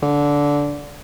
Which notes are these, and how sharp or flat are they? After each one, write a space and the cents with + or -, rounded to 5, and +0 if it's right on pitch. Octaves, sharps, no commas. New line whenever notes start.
D3 -15